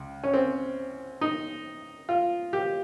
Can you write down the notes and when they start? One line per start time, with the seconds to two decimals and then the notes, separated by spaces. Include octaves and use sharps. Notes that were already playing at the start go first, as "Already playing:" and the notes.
Already playing: C#2
0.23 C#4
0.34 C4
1.21 D#4
2.09 F4
2.53 G4